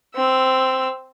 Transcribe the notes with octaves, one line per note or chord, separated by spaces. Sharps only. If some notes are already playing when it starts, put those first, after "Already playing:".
C4 E6